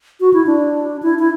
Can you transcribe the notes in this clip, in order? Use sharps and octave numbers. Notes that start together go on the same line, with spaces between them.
F#4
E4
D4
E4
E4